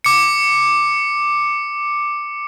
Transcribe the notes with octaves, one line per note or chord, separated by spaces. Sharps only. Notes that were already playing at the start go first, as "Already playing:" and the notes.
D6 C#7